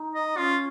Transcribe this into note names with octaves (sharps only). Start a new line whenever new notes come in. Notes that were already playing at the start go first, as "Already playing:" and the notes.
Already playing: D#4
D#5
C#4 F4